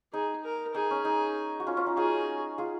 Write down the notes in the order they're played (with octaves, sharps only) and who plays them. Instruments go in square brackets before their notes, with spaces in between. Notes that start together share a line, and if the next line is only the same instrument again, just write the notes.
[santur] D#4 [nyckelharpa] G#4
[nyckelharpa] A#4
[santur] D#4 [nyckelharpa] G#4
[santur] C#4
D#4
F#4
C#4 F4
C#4 F4
D#4
[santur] D#4 F#4 [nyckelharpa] G#4
[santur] F4 G#4